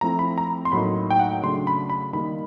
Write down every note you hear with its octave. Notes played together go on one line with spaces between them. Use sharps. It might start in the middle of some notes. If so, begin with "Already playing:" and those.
F3 A3 C4 E4 A#5
B5
A#5
C6
A2 F#3 A#3 D#4 B5
G5
F#5
C#3 F#3 A3 D4 C6
B5
B5
D#3 G3 A#3 D#4 B5